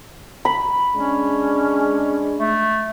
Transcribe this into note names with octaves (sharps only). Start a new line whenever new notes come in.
B5
G#3 C#4 D4
A3